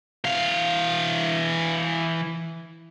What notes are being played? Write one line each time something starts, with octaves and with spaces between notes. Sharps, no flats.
E3 F5